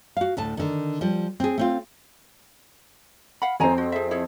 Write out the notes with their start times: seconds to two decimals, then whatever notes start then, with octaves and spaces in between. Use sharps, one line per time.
0.17 F#4 F5
0.37 D2 A2 A5
0.57 D3 D#3
1.01 F3 G3
1.40 C4 G#4
1.58 A3 C4 F4
3.42 F5 F#5 B5
3.60 F2 C4 C#5 G#5 A#5
3.78 F#4
3.92 G#4 E5
4.11 E4 G#4 C#5